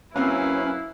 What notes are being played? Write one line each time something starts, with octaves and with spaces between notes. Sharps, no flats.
F#2 A#3 C4 C#4 E4 A#4 B4 F5